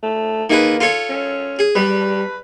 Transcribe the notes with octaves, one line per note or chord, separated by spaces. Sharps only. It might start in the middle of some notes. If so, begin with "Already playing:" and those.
A3
D#3 A#3 G#4 B4
F4 A4 C#5
C#4
G#4
G3 B4